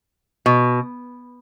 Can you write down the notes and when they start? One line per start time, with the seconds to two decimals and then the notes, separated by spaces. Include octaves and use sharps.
0.46 B2